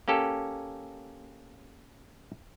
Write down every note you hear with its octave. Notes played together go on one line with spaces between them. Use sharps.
A#3 C#4 G4 A4